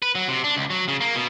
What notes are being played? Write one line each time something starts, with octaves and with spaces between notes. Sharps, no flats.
B4
F#3
C3
D4
C#2
F#3
C#3
A#3
B2